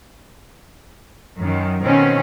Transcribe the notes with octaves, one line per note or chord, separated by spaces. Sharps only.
F#2 D#3
B2 D#3 C4 C#4